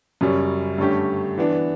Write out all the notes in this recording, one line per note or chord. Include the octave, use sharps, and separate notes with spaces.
F#2 C#3 G3 C#4
G2 D3 A3 C#4 G4
E3 B3 D4